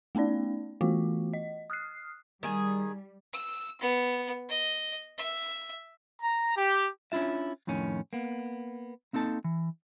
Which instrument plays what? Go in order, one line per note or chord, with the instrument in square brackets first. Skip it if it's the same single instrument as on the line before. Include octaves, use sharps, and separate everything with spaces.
[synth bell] A3 B3 C#4 D#4 D5
E3 A3 B3 F4 F#4
D#5
D#6 F6 F#6 C7
[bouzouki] D#3 G#4 [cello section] G3
[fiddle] E6
B3
D#5
E5
[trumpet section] A#5
G4
[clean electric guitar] C#4 D4 E4 F4 E5
F2 A2 D#3 C#4
A#3 B3
A#3 C4 D#4 A4 A5
E3